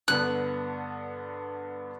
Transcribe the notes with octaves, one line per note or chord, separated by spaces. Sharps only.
G2 D3 B3 F#6